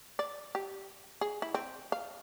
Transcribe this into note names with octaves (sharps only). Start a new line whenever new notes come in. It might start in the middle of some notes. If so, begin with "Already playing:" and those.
D5
G4
G#4
E4
C4
F5